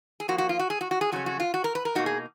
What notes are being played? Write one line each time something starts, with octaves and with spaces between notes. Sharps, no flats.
G#4
F2 F3 A#3 F#4
F#4
F4
F#4
G#4
F#4
F#4
G#4
F2 C#3 F#3 C#4 F#4
F#4
F4
F#4
A#4
B4
A#4
B2 A#3 D#4 F#4
G#4